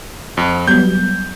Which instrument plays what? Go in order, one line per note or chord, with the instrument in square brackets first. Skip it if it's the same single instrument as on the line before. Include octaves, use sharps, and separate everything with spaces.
[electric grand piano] F2
[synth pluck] F#3 G3 B3 [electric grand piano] G6